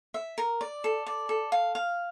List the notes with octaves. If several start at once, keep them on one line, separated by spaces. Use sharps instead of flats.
E5
A#4
D5
A4
D5
A4
F5
F5